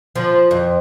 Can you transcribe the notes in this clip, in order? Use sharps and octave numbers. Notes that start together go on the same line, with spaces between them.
F3
F2